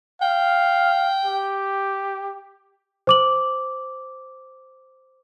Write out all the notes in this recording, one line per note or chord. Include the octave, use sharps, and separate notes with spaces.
F5 G5
G4
C5 D6 F#7